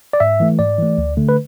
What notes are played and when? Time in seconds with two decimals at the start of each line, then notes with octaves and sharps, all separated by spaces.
0.13 D5
0.20 G#2 E5
0.40 E3 A3
0.59 G#2 D5
0.79 E3 A3
0.98 D2
1.17 D3 A3
1.29 B4